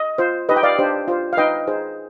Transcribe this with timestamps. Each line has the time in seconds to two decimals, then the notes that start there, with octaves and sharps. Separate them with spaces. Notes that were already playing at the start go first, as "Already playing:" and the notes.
Already playing: D#5
0.18 F4 C5
0.49 D#4 G4 B4 D#5
0.56 G5
0.63 D5 F5
0.79 D4 G4 C5
1.08 F4 C5
1.33 F5
1.37 D#4 B4 D#5 G5
1.67 D#4 G#4 C5